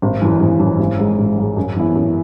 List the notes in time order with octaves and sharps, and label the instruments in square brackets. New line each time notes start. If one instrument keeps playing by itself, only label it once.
[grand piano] G#1
F#2 E3
G#1
F#2 E3
G#1
G#2 G#3
G#1
G#2 G#3
F#2
E3 B3 E4
F#2